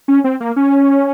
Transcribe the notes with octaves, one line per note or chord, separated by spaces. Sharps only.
C#4
C4
A#3
C#4